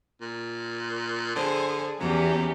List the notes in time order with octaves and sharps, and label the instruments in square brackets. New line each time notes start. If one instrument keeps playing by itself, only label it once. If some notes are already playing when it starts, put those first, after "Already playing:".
[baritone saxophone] A#2
[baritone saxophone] D3 [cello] G#4 C5
[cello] E2 E3 [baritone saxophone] F#3 [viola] C#4 G4